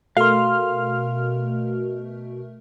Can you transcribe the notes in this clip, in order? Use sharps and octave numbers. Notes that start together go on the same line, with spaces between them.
B2 A3 A#4 F5 C6 F6